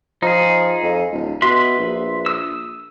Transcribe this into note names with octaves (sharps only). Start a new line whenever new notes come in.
F3 D#4 G#4
F2
D1
B2 B4 E5 C6
A#1
D#6 E6